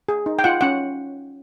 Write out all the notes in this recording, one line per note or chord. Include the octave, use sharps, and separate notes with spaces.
G#4
D#4
G5
F4 F#5
C#4 F#5